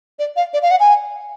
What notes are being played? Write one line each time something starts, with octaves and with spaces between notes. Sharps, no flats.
D5
F5
D5
F5
F#5
G#5